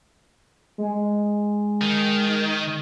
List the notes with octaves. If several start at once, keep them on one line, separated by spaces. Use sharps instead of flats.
G#3
D#3